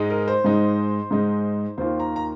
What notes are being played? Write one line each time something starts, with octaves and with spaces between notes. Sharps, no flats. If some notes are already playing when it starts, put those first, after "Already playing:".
Already playing: G#2 G#3 D#4
A#4
C5
G#2 G#3 D#4
G#2 G#3 D#4
D#2 D#3 A#3 F4 C5
A#5
A#5